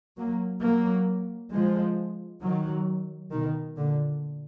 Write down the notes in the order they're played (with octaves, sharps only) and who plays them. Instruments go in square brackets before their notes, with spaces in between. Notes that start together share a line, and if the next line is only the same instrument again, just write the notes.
[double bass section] F#3 A#3
F#3 A#3
F3 G#3
D#3 F#3
B2 D#3
A#2 D3